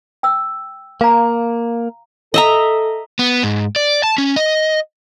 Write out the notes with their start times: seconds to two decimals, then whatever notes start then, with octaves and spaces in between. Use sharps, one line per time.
0.23 G5 E6
1.01 A#3 F5 A#5
2.34 A4 D#5 E5 A#5
3.19 B3
3.43 G#2
3.76 D5
4.04 A5
4.18 C#4
4.36 D#5